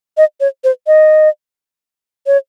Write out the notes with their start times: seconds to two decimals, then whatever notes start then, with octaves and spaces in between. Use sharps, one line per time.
0.17 D#5
0.41 C#5
0.64 C5
0.87 D#5
2.27 C#5